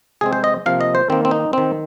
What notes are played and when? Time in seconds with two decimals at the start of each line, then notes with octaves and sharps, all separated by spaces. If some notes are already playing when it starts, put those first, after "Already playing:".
0.21 C3 G#3 C4 G#4
0.33 C5
0.44 D#5
0.66 C3 F3 A#3 F5
0.81 D#5
0.95 C5
1.10 D#3 A#3 C4
1.25 C4
1.31 D#4
1.53 D#3 C4